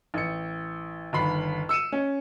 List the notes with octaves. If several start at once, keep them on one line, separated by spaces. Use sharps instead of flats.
A1 C#7
G1 D#2 B5 C7
E6 C#7 D#7 E7
C#4